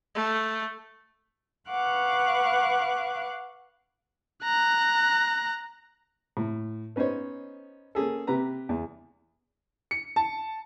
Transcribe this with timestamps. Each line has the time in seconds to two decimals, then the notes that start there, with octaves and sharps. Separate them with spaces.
0.15 A3
1.70 B4 F5 F#5 C#6 D6 F#6
4.44 A#5 F#6
6.37 A2
6.96 B3 C#4 D#4 C5 C#5
7.95 A#3 C#4 G#4 A4
8.27 C3 G4 B4 A#5
8.69 E2
9.91 C#7
10.16 A5